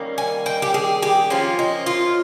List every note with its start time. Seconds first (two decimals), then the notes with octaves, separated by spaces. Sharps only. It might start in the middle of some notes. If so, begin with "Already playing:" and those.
Already playing: D#3 G3 A#3 C#4
0.18 G#5
0.46 G5
0.62 G4
0.74 G#4
1.02 G4
1.30 F3 A#3 C#4 F4
1.59 D#4
1.86 F4